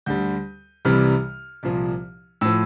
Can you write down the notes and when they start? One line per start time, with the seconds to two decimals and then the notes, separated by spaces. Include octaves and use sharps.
0.06 D2 D3 G3 G6
0.85 C2 C3 E3 G3 F6
1.63 C2 A#2 F3
2.41 A2 F3 E6